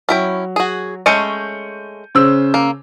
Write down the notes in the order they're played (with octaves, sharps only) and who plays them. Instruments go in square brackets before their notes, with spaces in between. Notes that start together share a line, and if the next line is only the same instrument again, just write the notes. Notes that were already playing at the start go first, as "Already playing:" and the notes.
[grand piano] F#3 [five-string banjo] C#4 E4 G5
[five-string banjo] F#4 G#4
[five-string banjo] G#3 A3 C#4 [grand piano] G6 C#7 D#7
[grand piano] C#3 C5 E6
[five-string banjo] A#3